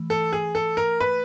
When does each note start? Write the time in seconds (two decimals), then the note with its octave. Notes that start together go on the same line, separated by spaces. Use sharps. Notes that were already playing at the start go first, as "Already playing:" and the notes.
Already playing: E3 A3
0.10 A4
0.33 G#4
0.55 A4
0.77 A#4
1.00 B4